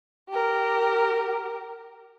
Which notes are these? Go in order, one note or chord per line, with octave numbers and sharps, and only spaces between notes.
G4 A#4